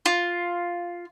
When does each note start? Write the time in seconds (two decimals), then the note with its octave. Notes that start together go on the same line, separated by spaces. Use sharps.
0.06 F4